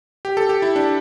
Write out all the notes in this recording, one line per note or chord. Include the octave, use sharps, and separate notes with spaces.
G4
A4
G4
E4
D4